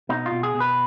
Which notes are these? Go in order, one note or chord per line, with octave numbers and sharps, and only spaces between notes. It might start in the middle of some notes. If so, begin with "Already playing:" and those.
B2 D#4
F4
B2
G#4
B2
B4